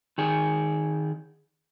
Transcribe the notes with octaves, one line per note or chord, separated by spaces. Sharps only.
D#3 G#4